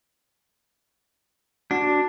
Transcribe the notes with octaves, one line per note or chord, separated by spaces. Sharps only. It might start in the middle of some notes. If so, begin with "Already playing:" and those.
D4 F#4